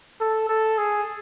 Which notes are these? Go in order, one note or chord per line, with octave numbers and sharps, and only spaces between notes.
A4
A4
G#4